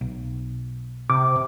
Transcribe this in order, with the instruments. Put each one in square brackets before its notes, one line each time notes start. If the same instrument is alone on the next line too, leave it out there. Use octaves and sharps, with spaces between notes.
[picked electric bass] B1
[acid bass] C3 [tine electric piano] D6